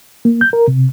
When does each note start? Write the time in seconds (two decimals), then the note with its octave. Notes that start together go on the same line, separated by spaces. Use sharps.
0.25 A#3
0.41 G6
0.53 A#4
0.68 C3